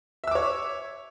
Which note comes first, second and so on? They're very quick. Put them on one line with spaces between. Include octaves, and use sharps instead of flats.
E5 E6 D6 C#5